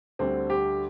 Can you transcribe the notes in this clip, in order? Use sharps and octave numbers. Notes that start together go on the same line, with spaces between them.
D2 D3 G3 C4
G4